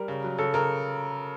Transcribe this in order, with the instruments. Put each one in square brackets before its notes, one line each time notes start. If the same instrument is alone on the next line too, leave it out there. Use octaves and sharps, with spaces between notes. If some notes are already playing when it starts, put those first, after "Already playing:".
Already playing: [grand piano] G3 [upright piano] A#4
[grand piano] C#3
F#3
[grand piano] C#3 [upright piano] A4
[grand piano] C#3 [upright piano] A#4